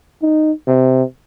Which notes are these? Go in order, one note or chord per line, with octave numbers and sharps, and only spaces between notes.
D#4
C3